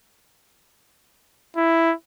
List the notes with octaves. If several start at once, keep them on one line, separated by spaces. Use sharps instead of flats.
E4